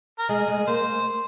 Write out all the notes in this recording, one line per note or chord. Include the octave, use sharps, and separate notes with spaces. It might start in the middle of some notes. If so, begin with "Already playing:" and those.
A#4
G#3 G#4
G#3
A#3 C5